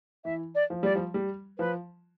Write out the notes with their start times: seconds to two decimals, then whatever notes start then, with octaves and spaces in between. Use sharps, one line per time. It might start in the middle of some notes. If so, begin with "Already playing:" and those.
0.25 E3 E5
0.55 D5
0.70 F3
0.83 G3 D5
0.95 F3
1.14 G3
1.58 F3 B4